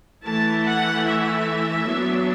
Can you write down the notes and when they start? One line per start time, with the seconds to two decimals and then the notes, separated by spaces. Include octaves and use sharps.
0.24 E3 A3 E4 A5
0.65 F#5
1.05 E5
1.87 F#3 B3 D4